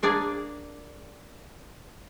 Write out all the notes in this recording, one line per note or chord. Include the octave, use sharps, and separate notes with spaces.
A#3 D4 G#4 D5